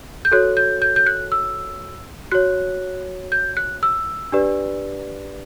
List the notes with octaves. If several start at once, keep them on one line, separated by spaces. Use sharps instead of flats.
G6
F#4 A4 C#5 F#6
G6
G6
G6
F#6
E6
F#4 C#5 F#6
G6
F#6
E6
D4 G4 B4 D5